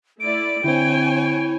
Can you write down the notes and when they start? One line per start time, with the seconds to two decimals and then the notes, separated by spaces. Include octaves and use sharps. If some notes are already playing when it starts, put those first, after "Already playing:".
0.20 A3 E4 D5 D7
0.64 D3 C4 E4 C#5 G5 G#5